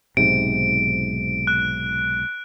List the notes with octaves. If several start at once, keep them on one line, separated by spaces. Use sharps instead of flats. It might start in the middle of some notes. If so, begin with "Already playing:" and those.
B1 G#2 C3 D7
F#6